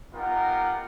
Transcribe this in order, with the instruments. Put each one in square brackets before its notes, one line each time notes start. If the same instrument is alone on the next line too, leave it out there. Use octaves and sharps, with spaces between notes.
[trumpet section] B3 D#4 F4 G4 A#4 F#5